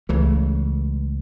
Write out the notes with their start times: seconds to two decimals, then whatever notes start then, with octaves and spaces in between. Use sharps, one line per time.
0.09 C#2 C#3 E3 A3